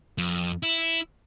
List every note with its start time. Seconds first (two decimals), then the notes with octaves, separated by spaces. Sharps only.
0.18 F2
0.63 E4